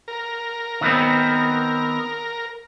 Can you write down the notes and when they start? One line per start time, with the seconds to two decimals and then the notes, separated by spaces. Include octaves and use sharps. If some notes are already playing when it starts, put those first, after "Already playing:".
0.08 A#4
0.81 D#3 B3 C4